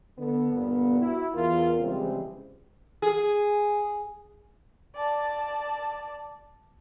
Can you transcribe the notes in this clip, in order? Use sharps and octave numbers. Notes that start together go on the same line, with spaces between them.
D3 B3
G1 G2 A#2 B3
E4 F#4
E2 F4 A#4
C#3 E3 F3 G3 G#3 C4
G#4
D5 A5